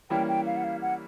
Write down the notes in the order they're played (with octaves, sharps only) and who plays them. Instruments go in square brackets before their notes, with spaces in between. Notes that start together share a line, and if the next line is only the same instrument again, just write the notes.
[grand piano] E3 G3 A#3 C#4 E4 [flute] G5
[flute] G5
F5
F#5
F5
F#5